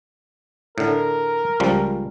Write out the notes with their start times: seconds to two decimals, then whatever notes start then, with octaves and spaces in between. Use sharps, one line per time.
0.78 A2 D3 A#4
1.60 C#2 F3 G3